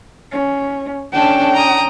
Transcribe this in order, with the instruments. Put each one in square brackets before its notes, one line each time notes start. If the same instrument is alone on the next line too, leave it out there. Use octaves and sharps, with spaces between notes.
[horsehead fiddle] C#4
[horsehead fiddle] C#4 G5 [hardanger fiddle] D4 A4
[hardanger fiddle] A#5 D#6